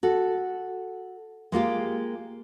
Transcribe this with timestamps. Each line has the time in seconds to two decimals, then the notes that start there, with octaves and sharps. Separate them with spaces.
0.03 F#4 A4
1.52 G#3 A#3 F4 G4